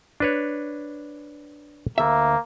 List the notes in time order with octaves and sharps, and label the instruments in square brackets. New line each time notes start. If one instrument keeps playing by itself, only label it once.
[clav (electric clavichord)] D4 B4 C#5
[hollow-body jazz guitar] D2 E5 [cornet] A#3